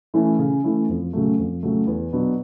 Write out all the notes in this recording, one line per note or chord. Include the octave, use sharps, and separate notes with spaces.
E3 A3 C#4 E4
C#3
E3 A3 C#4 E4
F2
C#3 F#3 A3
F2
C#3 F#3 A3
E2
B2 F#3 B3 D4